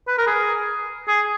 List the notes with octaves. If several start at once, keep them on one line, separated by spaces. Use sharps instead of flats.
B4
A#4
G#4
G#4